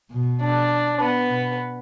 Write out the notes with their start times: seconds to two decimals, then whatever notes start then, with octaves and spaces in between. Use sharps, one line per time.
0.11 B2
0.41 D4
1.01 B3
1.30 B2